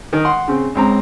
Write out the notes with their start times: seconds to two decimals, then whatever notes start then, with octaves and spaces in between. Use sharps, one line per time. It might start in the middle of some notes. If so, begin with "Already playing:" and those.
0.13 D#3
0.25 F#5 C6
0.48 C#3 C4
0.75 C#2 C4 A#5